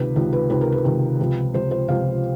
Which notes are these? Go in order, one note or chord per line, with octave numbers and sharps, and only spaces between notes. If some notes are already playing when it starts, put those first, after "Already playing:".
Already playing: C#2 C3 D#3 B4
C#2 C3 D#3
B4
C#2 C3 D#3 B4
A#4
B4
C#2 C3 D#3
C#2 C3 F3
C#2 C3 F3 C5
C5
C#2 C3 F3 F5